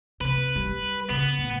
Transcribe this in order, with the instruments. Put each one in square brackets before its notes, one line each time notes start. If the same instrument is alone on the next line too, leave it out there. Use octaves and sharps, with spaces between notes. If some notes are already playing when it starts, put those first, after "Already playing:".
[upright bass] C3 [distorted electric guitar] B4
[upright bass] G3
[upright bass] C#3 [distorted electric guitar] B3
[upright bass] A2